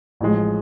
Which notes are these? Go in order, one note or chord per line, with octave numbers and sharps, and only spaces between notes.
A1 A2 F3 G#3